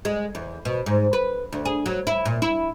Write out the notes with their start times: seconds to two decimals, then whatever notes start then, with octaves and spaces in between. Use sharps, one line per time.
0.05 G#3
0.35 E2
0.65 B2
0.86 G#2
1.13 B4
1.53 D2
1.65 G#4
1.86 F#3
2.07 E4
2.25 A#2
2.42 E4